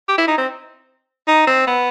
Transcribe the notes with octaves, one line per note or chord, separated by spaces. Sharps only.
G4
E4
D#4
C4
D#4
C4
B3